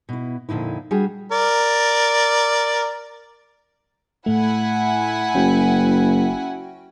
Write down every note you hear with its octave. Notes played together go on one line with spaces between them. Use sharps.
B2 E4
F2 A#2 D3 D#4 E4
G3 D4 F#4 G#4
A#4 D5
A2 A3 E4 F#5 G#5
F#1 C#4 F#4 G5